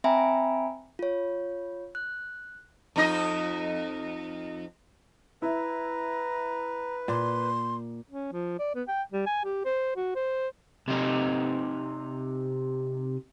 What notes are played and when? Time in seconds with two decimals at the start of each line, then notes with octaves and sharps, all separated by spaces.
0.04 C4 E5 G5 G#5 A#5 B5
0.99 F4 C#5
1.95 F#6
2.96 F2 D#4 D#5
5.42 E4 B4 A#5
7.08 A#2 C6
8.10 C#4
8.33 F3
8.59 D5
8.75 B3
8.88 G5
9.12 G3
9.26 G#5
9.44 G4
9.65 C5
9.96 F#4
10.15 C5
10.88 C3 D#4